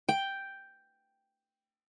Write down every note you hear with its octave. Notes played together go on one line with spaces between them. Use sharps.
G5